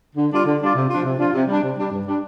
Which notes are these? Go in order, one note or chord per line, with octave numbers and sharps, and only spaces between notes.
D3
G3 D4 F4 D5
D3
G3 D4 F4 D5
C3
F3 D4 F4
C3
F3 D4 F4
C3
G3 D4
C3
G3 D4
G2
G3 D4